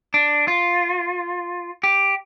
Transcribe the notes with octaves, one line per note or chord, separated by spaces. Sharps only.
D4
F4
G4